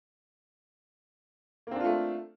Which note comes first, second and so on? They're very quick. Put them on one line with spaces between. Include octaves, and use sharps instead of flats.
A#3 C4 D4 F4 A3